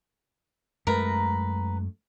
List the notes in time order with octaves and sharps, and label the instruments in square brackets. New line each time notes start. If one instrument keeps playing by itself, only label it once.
[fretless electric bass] F#2 G#3 A3 [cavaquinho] A#4 B4 A#5